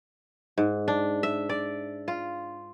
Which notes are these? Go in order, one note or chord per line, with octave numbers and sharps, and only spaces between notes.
G#2
D4
E5
D5
F4